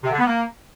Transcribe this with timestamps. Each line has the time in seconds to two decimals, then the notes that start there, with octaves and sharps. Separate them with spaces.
0.03 C3
0.11 D3
0.18 B3
0.26 A#3